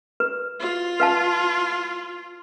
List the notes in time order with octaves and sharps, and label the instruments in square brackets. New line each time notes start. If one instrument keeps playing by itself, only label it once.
[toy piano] B4
[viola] F4
[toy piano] B4 F5 A5